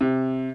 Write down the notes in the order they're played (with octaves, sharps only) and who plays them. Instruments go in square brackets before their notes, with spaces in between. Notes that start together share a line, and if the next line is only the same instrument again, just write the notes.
[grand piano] C3